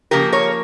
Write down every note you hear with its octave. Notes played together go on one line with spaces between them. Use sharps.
C#3 F3 A#3 G4 A#4
A#4 C#5